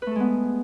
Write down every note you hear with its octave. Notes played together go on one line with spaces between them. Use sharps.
G#3 A3 B3 A4 B4